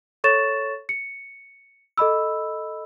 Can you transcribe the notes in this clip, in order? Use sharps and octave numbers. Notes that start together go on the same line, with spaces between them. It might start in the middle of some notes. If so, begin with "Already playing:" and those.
A4 C#5 C#6 A6 E7
C#7
A4 D#5 B5 E6